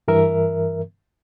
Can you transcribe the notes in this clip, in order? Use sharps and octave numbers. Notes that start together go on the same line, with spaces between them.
G2 E3 A#4 E5